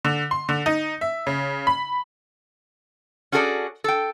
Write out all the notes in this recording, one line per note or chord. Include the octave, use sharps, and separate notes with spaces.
D3
C6
D3
D#4
E5
C#3
B5
C#4 F#4 G#4 A4 C5 D5
A4 G5